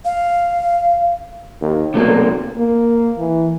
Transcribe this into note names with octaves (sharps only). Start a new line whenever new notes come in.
F5
D#2
B1 C3 A3 A#3
A#3
E3